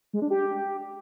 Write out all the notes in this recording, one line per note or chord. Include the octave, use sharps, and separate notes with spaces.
G#3
D4
G4